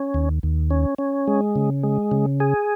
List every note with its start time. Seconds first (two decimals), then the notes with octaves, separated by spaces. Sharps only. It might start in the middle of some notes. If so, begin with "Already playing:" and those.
Already playing: C#4
0.14 D#2
0.43 D#2
0.70 C#4
0.98 C#4
1.28 G#3
1.56 C#3
1.83 G#3
2.11 C#3
2.40 G#4